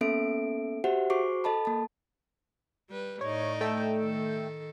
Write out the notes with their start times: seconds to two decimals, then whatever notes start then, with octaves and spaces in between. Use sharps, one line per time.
0.01 A#3 B3 C#4 A4 E5 D7
0.84 F#4 G4 C5 E5 F#5
1.10 F#4 G#4 C5 C#6 D6 C7
1.44 A4 D#5 A5 B5
1.65 A#3 A5
2.89 G3 B4
3.21 A2 D#4 C#5 D5
3.61 A3 G5 E6
3.98 D#3 A4